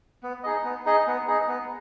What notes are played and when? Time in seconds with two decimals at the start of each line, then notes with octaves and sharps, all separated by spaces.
0.23 B3
0.44 D#4 G#4 D#5
0.65 B3
0.86 D#4 G#4 D#5
1.07 B3
1.28 D#4 G#4 D#5
1.48 B3